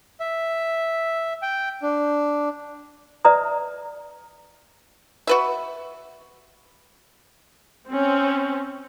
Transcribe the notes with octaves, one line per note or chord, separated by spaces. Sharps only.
E5
G5
D4
B4 D5 E5 A#5 D#6
F#4 B4 E5
C4 C#4